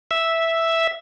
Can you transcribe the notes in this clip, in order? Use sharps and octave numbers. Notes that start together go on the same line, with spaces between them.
E5